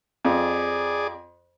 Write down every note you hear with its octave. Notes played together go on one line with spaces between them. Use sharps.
F2 G#4 D5